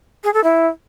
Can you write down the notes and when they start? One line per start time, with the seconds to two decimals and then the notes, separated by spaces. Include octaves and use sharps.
0.24 G#4
0.34 A4
0.44 E4